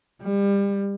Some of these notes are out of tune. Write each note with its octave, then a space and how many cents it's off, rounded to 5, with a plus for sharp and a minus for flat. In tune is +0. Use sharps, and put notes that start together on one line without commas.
G3 +30